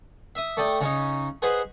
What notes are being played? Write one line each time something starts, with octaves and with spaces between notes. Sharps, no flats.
E5 D#6
A3 D5 G5 D#6
C#3 C#4 D#4
G#4 B4 C5 D#5 F#5